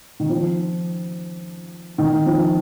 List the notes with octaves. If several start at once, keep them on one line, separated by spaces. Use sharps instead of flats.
D#3
F3
D#3
F3